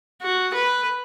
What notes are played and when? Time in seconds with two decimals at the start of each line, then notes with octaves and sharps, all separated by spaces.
0.22 F#4
0.54 B4